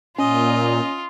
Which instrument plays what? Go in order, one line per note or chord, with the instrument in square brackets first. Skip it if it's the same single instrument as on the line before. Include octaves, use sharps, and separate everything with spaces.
[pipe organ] A#2 [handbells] C#4 [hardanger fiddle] F4 [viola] D#5